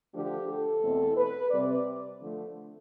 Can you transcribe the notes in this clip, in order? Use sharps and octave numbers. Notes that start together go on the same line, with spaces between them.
D3 F3 A3 D4 G4
A4
E2 B2 A3 C4
B4
C3 G3 C4 D5
D3 F3 A3